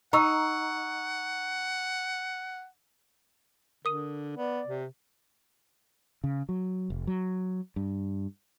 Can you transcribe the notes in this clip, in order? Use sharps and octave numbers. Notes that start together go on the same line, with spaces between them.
D#4 F#5 A#5 C#6 E6
D3 A#4 D#6 D#7
B3 D5
C3
C#3
F#3
F1
F#3
G2